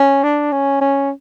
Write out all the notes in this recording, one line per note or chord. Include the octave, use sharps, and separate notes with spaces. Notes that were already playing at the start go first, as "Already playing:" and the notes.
Already playing: C#4
D4
C#4
C#4